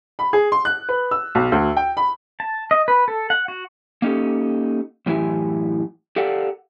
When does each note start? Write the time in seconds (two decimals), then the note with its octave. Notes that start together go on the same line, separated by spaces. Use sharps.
0.19 B5
0.33 G#4
0.52 C6
0.65 F#6
0.89 B4
1.11 E6
1.35 B1
1.52 D2
1.77 G5
1.97 B5
2.40 A5
2.71 D#5
2.88 B4
3.08 A4
3.30 F#5
3.48 F#4
4.02 A#3 C#4 D#4 G4 A4
5.06 F#2 A2 E3 E4 G4 G#5
6.16 G4 A4 A#4 D5 F5 F#5